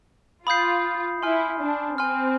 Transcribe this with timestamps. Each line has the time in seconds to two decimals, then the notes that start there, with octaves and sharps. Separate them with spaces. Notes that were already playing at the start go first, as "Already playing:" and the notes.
0.46 F4 B5 D#6 G6 C7
1.23 E4 G#5 C6 F6
1.61 D4
1.98 C4 G#5 C6 F6